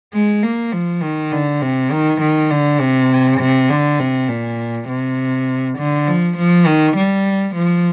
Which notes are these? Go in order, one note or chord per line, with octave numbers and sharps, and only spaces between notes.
G#3
A#3
F3
D#3
D3
C3
D#3
D#3
D3
C3
C3
D3
C3
A#2
C3
D3
F3
F3
D#3
G3
F3